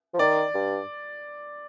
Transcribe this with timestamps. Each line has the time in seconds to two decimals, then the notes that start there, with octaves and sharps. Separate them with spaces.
0.14 F3
0.19 D#3 D5
0.55 G2